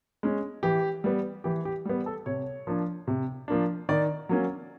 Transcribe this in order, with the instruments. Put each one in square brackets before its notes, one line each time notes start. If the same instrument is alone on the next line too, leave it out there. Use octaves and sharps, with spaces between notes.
[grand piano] G#3 C#4
E3 G4
G3 B3
E3 G4
G4
G3 B3
A4
C3 C#5
F3 A#3 D4
C3
F3 A#3 D4
D#3 D5
F#3 A#3 C#4